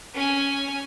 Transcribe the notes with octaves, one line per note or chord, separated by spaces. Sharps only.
C#4 G#5